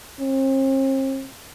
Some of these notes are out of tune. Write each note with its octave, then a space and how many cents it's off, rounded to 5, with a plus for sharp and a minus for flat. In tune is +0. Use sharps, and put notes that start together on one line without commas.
C4 +40